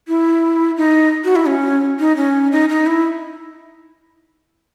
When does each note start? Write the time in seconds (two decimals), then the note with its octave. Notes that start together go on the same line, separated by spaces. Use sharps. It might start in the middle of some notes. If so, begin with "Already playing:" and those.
0.08 E4
0.77 D#4
1.24 F#4
1.36 E4
1.47 C#4
1.99 D#4
2.17 C#4
2.52 D#4
2.69 D#4
2.87 E4